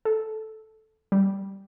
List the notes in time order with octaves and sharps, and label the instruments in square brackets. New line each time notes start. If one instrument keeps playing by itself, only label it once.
[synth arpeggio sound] A4
G3